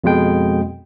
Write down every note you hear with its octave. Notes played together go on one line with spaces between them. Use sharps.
F2 B2 G#3 G5